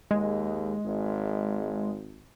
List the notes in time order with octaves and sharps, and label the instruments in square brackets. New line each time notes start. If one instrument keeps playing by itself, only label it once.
[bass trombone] D#2 [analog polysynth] G#3
[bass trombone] G#1